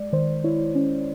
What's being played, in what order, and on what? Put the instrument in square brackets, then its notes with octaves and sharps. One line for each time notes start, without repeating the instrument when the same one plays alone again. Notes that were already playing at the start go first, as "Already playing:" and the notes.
Already playing: [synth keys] G#3 D5
D#3 C5
E4 C#5
C#4